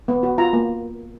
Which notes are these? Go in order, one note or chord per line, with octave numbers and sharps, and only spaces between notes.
B3
F#4
F4 A#5
A#3